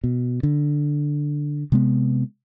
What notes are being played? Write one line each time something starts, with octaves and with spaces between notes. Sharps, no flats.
B2
D3
C3 G#3 B3